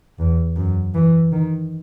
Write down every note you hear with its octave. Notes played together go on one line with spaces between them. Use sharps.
E2
F#2
E3
D#3